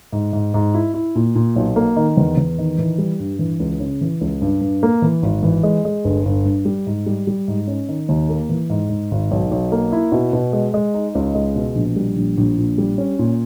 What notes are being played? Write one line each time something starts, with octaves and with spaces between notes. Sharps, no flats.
G#2
G#2
G#2
E4
E4
A#2
A#2
B1
A#3
D#3
E2
E2
D#3
E3
G3
G2
E3
C#2
C#3
E3
C#2
G2
G2
A#3
E3
G#1
E3
G#3
G#3
G1
G1
G2
G3
G#2
G3
G3
G#2
C#4
D#3
D#2
A#3
E3
G#2
G#2
G#1
B1
B1
A#3
E4
B2
B2
G#3
G#3
D#4
C#2
G#3
B2
A#1
G3
A#1
A#1
A#2
G3
C#4
A#2